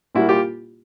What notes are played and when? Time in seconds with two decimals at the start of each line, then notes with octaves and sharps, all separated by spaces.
0.15 A#2 G3 A#3 E4 F#4
0.29 F4 G4